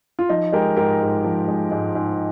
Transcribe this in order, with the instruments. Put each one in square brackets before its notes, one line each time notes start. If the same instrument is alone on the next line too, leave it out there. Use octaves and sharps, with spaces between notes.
[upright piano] F4
F3 D#4
G#3 G4 A#4
G#2 G4 A#4
G#2
F3
G#3
G#2
G#2